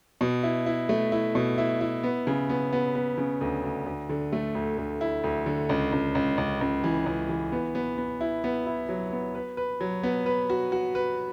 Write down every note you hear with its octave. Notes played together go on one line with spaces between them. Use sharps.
B2
E4
E4
A3
E4
B2
E4
E4
B3
C#3
B3
B3
B3
C#3
D2
D2
D2
D3
A3
D2
D2
E4
D2
D3
C#2
C#2
C#2
C#2
C#2
E3
C#2
E3
B3
B3
B3
E4
B3
E4
F#3
B3
B4
B4
F#3
B3
B4
F#4
F#4
B4